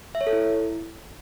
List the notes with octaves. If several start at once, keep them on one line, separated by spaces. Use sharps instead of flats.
E5
C#5
A4
E4